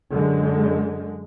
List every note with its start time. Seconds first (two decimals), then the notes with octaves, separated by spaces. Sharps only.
0.12 F#2 D3 G#3